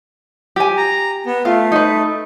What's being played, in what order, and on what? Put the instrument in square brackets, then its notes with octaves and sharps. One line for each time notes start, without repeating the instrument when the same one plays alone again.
[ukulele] G4 G#5
[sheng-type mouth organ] A#5
B3
[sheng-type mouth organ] A3 [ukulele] F4 F5
[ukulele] D#4 B4